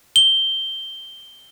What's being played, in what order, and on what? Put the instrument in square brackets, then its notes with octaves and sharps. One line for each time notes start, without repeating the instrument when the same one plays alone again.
[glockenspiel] G7